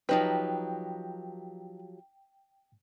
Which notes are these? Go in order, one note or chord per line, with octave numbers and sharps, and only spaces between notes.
F3 F#3 D#4 G4 B4 G5